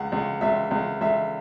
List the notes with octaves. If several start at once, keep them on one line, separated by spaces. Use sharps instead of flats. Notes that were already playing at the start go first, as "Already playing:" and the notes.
Already playing: C#2 F#5
C#2
C#2 E5
C#2
C#2 E5